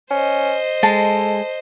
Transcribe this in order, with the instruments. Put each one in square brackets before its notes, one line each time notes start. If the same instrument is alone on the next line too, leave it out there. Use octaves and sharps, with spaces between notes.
[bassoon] C#4 [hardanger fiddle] C5 D#5
[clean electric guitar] G#3 [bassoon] A4 [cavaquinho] A5